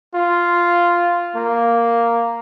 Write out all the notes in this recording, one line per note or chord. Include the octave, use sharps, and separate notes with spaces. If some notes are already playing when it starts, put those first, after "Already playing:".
F4
A#3